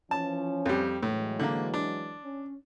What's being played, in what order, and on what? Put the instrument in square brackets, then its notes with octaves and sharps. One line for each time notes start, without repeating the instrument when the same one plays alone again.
[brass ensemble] E3 F3 C#4 [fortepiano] A5
[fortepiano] F2 G3
[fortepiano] A2 [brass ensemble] E3 F#3 G#3
[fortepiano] D3 A#3
D4
[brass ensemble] C#4